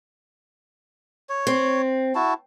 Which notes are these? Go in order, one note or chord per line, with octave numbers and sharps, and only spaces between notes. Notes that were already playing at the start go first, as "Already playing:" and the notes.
C#5
C4
E4 F#4 A5